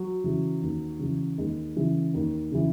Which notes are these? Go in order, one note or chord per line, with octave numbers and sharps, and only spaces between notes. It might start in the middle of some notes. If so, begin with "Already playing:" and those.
Already playing: F#3
C#3 E3
D#2
C#3 E3
D#2 G#3
C#3 E3
D#2
C#3 E3